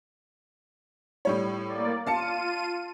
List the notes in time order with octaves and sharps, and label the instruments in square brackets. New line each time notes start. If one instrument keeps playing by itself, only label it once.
[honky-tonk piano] A2 G3 C#5
[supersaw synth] A#3 D5
[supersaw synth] F4 D#7 [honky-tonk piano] F5 A5 C#7